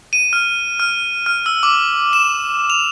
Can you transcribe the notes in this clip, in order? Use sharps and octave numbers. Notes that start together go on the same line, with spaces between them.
D#7
F6
F6
F6
E6
D6
E7
F7